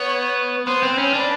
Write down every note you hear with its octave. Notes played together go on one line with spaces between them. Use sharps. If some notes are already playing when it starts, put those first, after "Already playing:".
Already playing: B3 C#5
B3 C5
C4
C#4 B4
D4